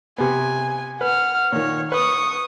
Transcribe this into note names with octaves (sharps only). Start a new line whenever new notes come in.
C3 B3 G#5
B4 F#5 F6
A#2 D#3 C#5
B4 C#6 D#6